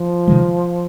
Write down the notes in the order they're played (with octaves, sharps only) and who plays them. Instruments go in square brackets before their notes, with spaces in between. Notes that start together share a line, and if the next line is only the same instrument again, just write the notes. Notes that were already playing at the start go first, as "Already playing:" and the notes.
Already playing: [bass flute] F3
[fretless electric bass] C3 D#3 G#3